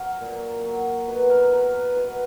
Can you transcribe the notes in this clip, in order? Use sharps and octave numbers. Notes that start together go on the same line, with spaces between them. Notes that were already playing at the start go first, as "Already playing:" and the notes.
Already playing: F#3 A#4
A#2
F#3
B2 B4
A#4
B4
F#3 A#4
B4
B2 B4